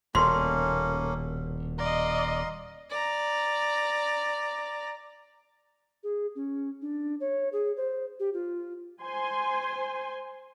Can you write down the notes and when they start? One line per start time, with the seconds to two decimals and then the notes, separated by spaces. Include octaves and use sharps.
0.15 D#1 B2 A#3 C#4 A4 C6
1.78 D5 D#5 F5 A#5 C6
2.90 D5 A#5
6.03 G#4
6.35 C#4
6.82 D4
7.20 C#5
7.53 G#4
7.77 C5
8.20 G4
8.34 F4
9.03 C5 G#5 C6